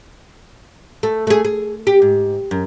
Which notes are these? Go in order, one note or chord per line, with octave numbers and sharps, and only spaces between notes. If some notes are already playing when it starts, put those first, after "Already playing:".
A3
A3 G#4
G#4
G4
G#2
F#2